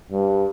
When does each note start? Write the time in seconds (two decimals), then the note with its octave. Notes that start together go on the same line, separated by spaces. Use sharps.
0.11 G2